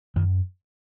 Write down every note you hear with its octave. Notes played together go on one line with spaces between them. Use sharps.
F#2 D#3